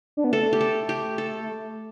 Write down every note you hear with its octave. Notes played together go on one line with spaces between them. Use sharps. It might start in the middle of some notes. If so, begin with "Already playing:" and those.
D4
B3
A3 A4
G4
A4
G4
A4